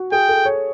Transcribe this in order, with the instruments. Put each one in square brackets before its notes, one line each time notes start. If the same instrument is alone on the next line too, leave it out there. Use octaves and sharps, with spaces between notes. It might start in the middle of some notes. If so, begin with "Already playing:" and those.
Already playing: [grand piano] F#4
[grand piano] G#4 [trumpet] G5
[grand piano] A4
C#5